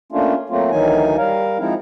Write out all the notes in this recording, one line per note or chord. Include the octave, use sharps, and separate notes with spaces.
A3 A#3 C#4 D4 F4
F#3 A3 A#3 C4 F4
D2 D#3 E3 F#3 D#4 G#5
G3 A#4 F5
F3 G#3 C4 D#4 E4